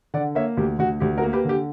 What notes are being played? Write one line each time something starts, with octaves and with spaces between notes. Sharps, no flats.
D3 D5 F#5
A#3 C#5 E5
D2 G4
D2 F#4
D2 G4
F#4 A#4
A#3
G4 B4
D3 G4